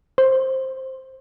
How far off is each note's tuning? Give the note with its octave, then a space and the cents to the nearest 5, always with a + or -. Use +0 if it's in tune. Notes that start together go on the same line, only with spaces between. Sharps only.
C5 +10